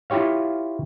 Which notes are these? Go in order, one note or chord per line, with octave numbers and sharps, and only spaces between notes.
E4 F4 G4 C#5 F5